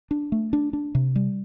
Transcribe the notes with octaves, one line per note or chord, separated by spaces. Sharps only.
D4
A3
D4
D4
C3
G3